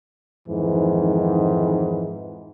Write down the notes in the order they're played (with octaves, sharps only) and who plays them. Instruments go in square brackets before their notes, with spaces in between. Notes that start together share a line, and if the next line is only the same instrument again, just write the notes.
[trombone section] F2 G#2 D#3 E3